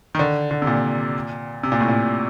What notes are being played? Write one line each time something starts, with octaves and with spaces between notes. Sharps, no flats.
D#3
D3
D3
C3
A#2
C3
A#2
A2
A#2